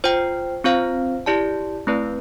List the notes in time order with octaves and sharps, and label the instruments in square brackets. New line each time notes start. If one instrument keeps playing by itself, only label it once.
[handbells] F4 C5 G5
C4 F4 C5 F5
E4 G4 D5 A5
A3 C4 E4 B4 D5